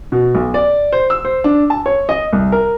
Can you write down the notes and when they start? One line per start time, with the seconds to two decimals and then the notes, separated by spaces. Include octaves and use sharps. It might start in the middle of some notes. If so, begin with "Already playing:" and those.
0.12 B2
0.35 B1
0.54 D5
0.93 C5
1.10 E6
1.25 C5
1.44 D4
1.70 A5
1.86 C#5
2.09 D#5
2.33 C2
2.52 A#4